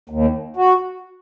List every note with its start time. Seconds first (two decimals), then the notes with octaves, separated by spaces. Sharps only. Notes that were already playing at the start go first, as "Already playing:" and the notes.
0.10 D#2
0.57 F#4